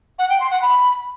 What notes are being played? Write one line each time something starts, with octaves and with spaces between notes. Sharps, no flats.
F#5
G5
C6
F#5
B5